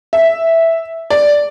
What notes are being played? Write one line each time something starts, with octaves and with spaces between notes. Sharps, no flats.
E5
D5